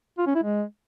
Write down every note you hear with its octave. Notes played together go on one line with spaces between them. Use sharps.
F4
C#4
E4
G#3